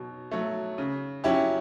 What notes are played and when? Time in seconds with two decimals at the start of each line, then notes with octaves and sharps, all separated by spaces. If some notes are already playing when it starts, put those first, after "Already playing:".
Already playing: B2 F#3
0.31 F#3 A3
0.78 C#3
1.24 F#3 C#4 E4 G4